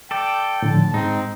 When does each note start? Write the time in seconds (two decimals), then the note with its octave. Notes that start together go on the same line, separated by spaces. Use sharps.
0.11 A4 D5 G5
0.62 A2 D3 F3 A5
0.94 G#2 C4 D#4